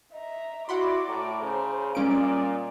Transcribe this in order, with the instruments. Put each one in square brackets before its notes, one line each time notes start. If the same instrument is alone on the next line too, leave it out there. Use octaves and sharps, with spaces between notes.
[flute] D#5 [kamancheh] E5 A#5
[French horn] E4 [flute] F#4 [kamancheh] D5 D6 [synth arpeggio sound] F#5 B5 C6
[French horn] A2 [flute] A#5
[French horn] C#3 [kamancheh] C5
[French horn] A#2 [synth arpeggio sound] G3 C#4 D7 [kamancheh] D5 D#5